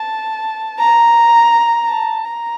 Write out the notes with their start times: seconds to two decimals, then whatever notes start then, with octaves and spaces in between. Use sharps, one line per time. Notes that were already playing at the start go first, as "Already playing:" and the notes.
Already playing: A5
0.79 A#5
1.89 A5
2.25 A#5